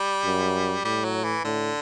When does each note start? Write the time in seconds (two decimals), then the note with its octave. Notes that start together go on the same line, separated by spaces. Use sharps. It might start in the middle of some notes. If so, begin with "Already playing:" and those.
Already playing: G3
0.24 F#2
0.84 A2 G3
1.04 F#3
1.24 E3
1.45 A2 D3